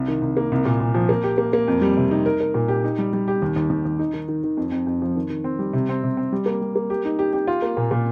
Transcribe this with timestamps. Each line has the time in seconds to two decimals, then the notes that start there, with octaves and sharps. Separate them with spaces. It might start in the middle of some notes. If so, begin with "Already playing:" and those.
Already playing: C2
0.08 D#3
0.22 C2
0.37 A#3
0.52 C2
0.65 A#2
0.80 A#2
0.94 F3
1.09 A#3
1.23 G4
1.38 A#3
1.53 A#3
1.68 F2
1.82 G3
1.97 C3
2.11 D#4
2.26 A#4
2.40 A#4
2.54 A#2
2.68 G4
2.84 D#4
2.99 G3
3.13 G3
3.28 G4
3.42 D#2
3.56 D#2
3.70 D#2
3.85 D#2
3.99 D#4
4.14 D#3
4.29 D#3
4.44 D#3
4.57 F2
4.72 F2
4.87 F2
5.02 F3
5.16 D#3
5.30 D#3
5.44 C4
5.59 G3
5.73 C3
5.89 C4
6.03 C3
6.17 C4
6.32 G3
6.46 A#3
6.62 G3
6.76 A#3
6.90 G4
7.05 D#4
7.19 G4
7.33 G4
7.47 F4
7.62 A#3
7.77 A#2
7.91 A#2